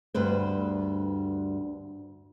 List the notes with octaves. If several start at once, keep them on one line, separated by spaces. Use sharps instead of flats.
D2 G2 B4 C5